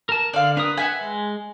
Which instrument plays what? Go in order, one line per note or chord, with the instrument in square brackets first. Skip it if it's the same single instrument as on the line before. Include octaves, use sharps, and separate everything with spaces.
[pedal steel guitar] A#4 A5
[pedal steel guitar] D3 [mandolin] D5 F5
[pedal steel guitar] D4 A#4 D#6 [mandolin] B4
[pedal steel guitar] B4 E5 F#5 [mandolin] G#5
[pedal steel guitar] G#3